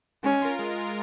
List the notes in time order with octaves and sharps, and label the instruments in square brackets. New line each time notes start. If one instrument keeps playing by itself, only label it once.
[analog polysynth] G#3 [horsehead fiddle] C#4
[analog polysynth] F4 A#4
G#3
F4 A#4